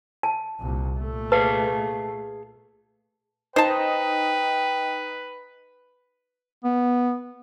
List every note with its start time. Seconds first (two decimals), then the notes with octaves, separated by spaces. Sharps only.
0.23 A5
0.60 C2 A#2
0.99 A#2 A3
1.32 G#4 B4 F5 A5
3.56 D#4 B4 C5 G5 A5
6.64 B3